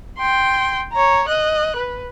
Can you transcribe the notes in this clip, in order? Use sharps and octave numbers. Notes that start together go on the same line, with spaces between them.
G5 C6
C#5 A#5
D#5 F#6
B4